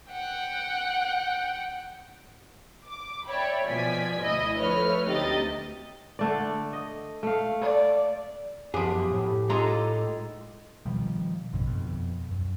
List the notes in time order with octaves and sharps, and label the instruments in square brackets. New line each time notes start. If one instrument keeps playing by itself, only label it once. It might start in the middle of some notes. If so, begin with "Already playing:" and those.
[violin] F#5 G5
[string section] D6
C#5 D5 E5 G5 B5
B2 F3 D5 G#5 G#6 B6
D2 E4 D#5
F3 A3 B4 C#5 F6
D2 C3 D#4 G4 D#5 A6
[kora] D3 A3 D5
D#5
A3 F5
[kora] A4 [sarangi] D5
[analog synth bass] F#2 [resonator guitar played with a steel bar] F3 B3 [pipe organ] G4 [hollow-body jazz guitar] G#4
[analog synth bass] A2
[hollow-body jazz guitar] G#3 D#4 [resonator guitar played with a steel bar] F4 A4 A#5
[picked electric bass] B2 D#3 F3 G3
A1 F#2 B2 D3
F2 B2
F#2